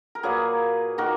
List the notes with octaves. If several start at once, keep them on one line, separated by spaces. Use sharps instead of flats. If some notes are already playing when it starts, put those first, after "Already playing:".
A#4
A#2 F#3 A#3 G#4 B4
D#3 A#3 F#4 A#4